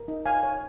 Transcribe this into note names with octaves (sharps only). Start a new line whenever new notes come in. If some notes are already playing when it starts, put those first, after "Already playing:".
Already playing: A#4
D#4
C#5 F5 G#5
C#5